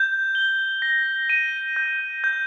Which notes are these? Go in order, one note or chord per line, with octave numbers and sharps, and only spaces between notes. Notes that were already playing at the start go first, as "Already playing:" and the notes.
Already playing: G6
G7
A#6
D#7
G6
G6